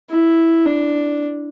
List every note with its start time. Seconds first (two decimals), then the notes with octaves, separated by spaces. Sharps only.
0.10 E4
0.66 D4